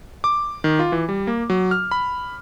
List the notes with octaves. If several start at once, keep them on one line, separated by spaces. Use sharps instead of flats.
D6
D#3
F4
E3
G3
A#3
F#3
F6
B5